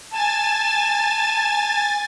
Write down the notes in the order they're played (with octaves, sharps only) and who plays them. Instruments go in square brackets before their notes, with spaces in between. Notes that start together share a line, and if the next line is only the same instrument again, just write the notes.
[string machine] G#5 A6 [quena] A5